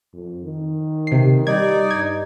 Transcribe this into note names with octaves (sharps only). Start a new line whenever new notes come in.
F2
D#3
C3 C7
G3 D#4 D5 G#6
G2 G#6